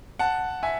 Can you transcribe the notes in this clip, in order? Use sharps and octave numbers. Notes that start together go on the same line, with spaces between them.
F#5 A5
E5 G#5